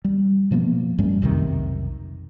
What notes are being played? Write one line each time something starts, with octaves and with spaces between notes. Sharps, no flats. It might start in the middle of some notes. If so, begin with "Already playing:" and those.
G3
B2 F3 A#3 B3
F#2 G3 A3 C#4
B1 F2 C3 D#3